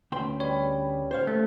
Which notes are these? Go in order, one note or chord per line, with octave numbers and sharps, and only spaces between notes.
D2 C#4 B4 G5 C6
G3 B4 C#5
C5 C#5 F5
A3 A4